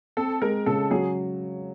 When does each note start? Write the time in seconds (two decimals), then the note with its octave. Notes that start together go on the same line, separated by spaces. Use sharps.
0.17 C4 A4
0.41 G#3 A#4
0.66 C#3 A4
0.91 F#3 G#4